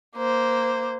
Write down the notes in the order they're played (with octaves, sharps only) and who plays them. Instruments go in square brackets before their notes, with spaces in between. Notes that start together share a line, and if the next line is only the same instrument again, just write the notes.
[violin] A#3 C5